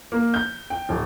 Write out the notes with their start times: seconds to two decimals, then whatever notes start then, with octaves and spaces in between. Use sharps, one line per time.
0.12 A#3
0.34 G6
0.70 G5
0.89 D1